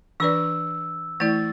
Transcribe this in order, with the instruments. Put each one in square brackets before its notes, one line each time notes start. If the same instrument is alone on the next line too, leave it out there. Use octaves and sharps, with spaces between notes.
[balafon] E3 D4 B4 D5 [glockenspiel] E6
[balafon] E3 A3 E4 D5 [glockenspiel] A6